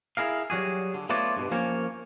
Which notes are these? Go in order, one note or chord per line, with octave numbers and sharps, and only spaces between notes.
E4 G#4 A#4 F5
F#3 G3 F#4 G#4
D3
A3 B3 F4 F#4 C#5 D5
G2 B2
F3 A#3 C#4 A#4 C#5